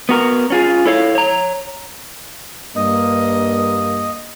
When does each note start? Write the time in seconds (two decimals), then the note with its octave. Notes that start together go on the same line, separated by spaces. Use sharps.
0.09 B3 F#4 A#4
0.50 C#4 F4 G#4
0.86 E4 A4 C#5 F5
1.15 C#5 A#5
2.75 G2 A#3 D#5